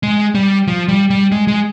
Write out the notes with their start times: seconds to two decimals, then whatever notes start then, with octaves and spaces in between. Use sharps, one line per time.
0.03 G#3
0.35 G3
0.67 F3
0.88 G3
1.10 G3
1.32 G#3
1.48 G#3